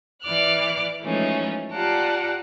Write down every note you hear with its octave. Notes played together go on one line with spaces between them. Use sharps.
E3 D5 D6 F6 F#6
E3 F3 G#3 A3 C#4 D#4
F4 G4 D5 F#5 A5 A#5